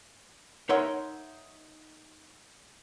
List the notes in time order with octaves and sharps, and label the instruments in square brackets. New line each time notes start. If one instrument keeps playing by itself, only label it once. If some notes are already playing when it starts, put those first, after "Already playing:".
[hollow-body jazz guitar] D#4 A#4 C#5 E5 F#5 C6